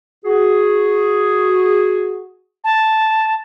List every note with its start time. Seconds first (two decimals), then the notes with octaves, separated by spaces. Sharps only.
0.25 F#4 G#4
2.64 A5